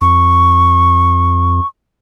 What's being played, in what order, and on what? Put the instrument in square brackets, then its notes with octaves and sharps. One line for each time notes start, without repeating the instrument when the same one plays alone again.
[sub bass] F2 [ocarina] C#6